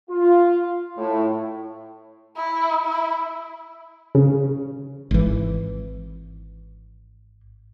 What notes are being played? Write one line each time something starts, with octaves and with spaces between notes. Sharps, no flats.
F4
A2
E4
E4
C#3
G#1 E3